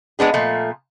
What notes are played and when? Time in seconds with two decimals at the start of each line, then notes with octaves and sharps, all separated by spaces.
0.19 G#3 B3 D4 G#4
0.34 A#2 F3 A3